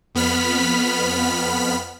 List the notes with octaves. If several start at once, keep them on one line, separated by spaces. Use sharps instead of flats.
F2 B3 B5 F6 B6